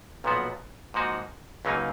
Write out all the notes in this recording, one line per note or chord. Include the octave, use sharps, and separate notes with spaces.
B1 A#2 F3 B3 F#4
G#2 F3 A#3 D#4 F#4
C#2 C#3 F#3 A#3 D#4